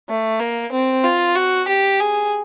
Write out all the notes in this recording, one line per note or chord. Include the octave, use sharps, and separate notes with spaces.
A3
A#3
C4
F4
F#4
G4
G#4